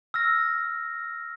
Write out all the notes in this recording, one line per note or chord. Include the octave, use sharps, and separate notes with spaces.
E6 F6 A#6